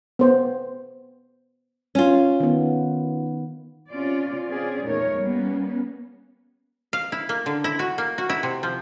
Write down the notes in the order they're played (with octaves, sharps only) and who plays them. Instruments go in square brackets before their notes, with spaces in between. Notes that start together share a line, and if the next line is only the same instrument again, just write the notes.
[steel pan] B3 C5
[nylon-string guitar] C#4 F4
[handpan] D#3 B3
[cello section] C3 C#4 F4 D5
C4 C#4 F4 G#4 D5
E2 A#2 A3 D#4 A#4 C#5
G3 A#3 B3 C#4
[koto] F5
E4
A#3
D3
E4
F#4
A#3
F#4
E4
C3
F3